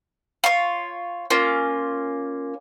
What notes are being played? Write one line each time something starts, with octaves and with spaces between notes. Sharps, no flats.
F4 C#5
A#3 C#4 F4